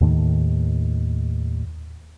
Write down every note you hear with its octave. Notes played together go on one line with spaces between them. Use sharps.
D#2 A2 D#3 A3